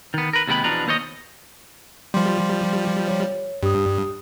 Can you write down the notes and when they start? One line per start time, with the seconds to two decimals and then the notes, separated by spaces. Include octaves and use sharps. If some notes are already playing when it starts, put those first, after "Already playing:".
0.14 D#3 B3
0.33 A#4 B4
0.47 D#2 C3 G#3 B3 G5 B5
0.64 E2 B2 F3 D4 B4 A#5
0.87 D#2 B3 C5 C#5 D#5
2.14 F3 G3 C6
3.07 C#5
3.63 G2 G4 D#6